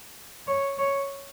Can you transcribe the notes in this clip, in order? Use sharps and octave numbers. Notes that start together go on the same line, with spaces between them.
C#5
C#5